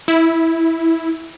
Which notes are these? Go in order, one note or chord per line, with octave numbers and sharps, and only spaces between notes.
E4